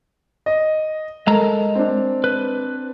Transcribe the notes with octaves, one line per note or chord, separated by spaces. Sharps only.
D#5
G#3 A4 A#4 A#5
C4 D4
B4